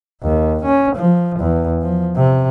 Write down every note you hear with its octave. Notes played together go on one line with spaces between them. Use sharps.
D#2
C#4
F3
E2
F3
C3